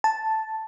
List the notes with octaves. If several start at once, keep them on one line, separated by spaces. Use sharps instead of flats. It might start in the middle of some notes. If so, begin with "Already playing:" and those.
A5